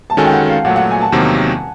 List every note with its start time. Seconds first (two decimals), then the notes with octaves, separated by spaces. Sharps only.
0.10 A5
0.17 D#3 G#3 C#4 F#4 A4 G#5
0.25 G5
0.33 F#5
0.49 F5
0.65 A#2 F#3 A3 F#5
0.76 F#5
0.91 G#5
1.01 A5
1.12 E2 C3 D#3 F#3 A#3